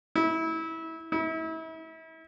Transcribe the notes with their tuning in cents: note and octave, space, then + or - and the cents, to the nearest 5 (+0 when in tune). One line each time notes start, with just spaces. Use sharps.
E4 -25
E4 -35